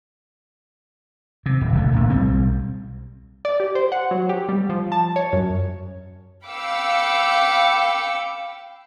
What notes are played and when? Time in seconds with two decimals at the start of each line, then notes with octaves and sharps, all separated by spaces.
1.46 C3
1.61 D#1
1.73 B1 D3 A3
1.93 D1 A#2 D3
2.10 B1 G3 C4
3.45 D5
3.60 G4
3.75 C5
3.92 F#5
4.11 F#3
4.29 G4
4.49 G3
4.69 F3
4.92 A5
5.16 C#5
5.33 F#2
6.47 F5 G5 B5 D6 E6 C#7